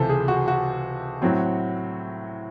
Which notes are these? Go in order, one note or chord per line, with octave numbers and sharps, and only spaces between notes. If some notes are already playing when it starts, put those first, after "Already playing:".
Already playing: C#2 C3 E3 A4 C5
G#4
F#4
F#4
A2 F#3 C4